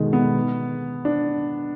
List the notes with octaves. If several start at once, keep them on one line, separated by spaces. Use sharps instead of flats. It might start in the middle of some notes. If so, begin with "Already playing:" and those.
Already playing: B2 D3 D#3 G#3
B3
D4